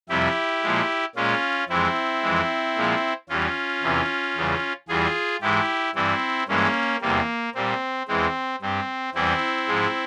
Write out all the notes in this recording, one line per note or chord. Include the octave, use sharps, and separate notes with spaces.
F2 C3 G3 E4 G4
A#2 F3 G#3
A#2 G#3 C#4 F4
F2 E3 G#3 C4 E4
F2 E3 G#3
A#2 F3 G#3
E2 E3 G3 C#4 F4
E2 C3 E3
E2 C#3 G3
E2 E3 G3 F4 G#4
G#2 E3 G#3 E4 G4
G2 E3 G3 C4 E4
G2 E3 G#3 A#3 C#4
E2 C3 G3 A#3
A#2 G3 C4
E2 E3 G#3 C4
G2 G3 C4
E2 E3 G3 C4 E4
G#2 F3 G#3